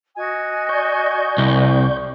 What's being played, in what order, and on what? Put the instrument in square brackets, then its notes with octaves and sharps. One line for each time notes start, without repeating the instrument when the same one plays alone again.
[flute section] F#4 D#5 G#5
[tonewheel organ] D5 C#6 G6
[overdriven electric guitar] C2